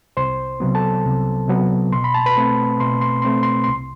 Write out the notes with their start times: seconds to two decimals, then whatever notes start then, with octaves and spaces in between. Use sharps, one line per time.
0.17 C2 C5 C6
0.60 C3 F#3 B3
0.75 A4 A5
1.05 C2
1.48 C3 F#3 B3
1.92 B2 C6
2.04 B5
2.14 A5
2.26 B4 B5
2.37 A3 C4
2.80 B2 C6
3.01 C6
3.22 A3 C4 C6
3.43 C6
3.64 C2 C6